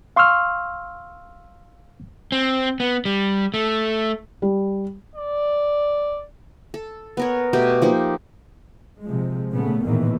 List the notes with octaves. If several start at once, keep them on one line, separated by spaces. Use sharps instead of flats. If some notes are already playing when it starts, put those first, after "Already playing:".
F5 C6 C#6 E6 F6
C4
B3
G3
A3
G3
D5
A4
B3 A#4 C#5
B2 A3 G4 G5
F3 A#3 D#4 G4
C3 F3 G#3
A#2 C#3 A3 B3
A#1 E2 A2 D#3 E3 A#3